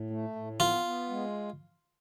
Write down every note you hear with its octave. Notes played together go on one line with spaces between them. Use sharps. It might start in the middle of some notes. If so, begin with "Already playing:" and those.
Already playing: A2
A3
A2
B3 F4
B3
G#3